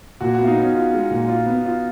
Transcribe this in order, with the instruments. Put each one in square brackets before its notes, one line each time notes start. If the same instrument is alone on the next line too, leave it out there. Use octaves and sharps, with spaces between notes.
[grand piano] A#2 [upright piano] F#4
[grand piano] B3 [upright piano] F#4
[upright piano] F4
D#4
[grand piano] B3 [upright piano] C#4
[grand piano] F4
G#3
A#2
F4
B3
F4